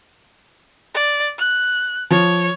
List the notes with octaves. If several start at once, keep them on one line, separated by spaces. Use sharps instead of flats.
D5
F#6
F3 C#5